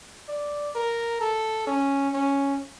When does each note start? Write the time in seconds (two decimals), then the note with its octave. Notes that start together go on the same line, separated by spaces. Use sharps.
0.28 D5
0.75 A#4
1.20 A4
1.67 C#4
2.14 C#4